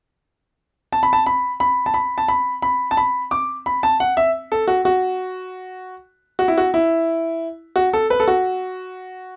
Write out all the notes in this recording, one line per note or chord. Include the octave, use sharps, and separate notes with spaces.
A5
B5
A5
B5
B5
A5
B5
A5
B5
B5
A5
B5
D6
B5
A5
F#5
E5
A4
F#4
F#4
F#4
E4
F#4
E4
F#4
A4
B4
A4
F#4